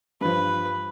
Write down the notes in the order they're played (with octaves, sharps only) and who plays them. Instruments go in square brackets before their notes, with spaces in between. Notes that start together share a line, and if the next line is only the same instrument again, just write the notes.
[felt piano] G2 F3 [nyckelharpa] B4